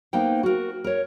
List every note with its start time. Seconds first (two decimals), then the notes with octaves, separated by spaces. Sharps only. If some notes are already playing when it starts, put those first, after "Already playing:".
0.13 A#3 B3 D#4 C5 G5
0.43 F#4 A#4
0.84 A#4 C#5